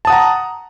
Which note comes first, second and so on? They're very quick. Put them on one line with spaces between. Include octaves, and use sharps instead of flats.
A5 D#6 F#5 A#5